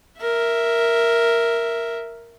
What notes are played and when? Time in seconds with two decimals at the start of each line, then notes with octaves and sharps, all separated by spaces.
0.21 A#4 E5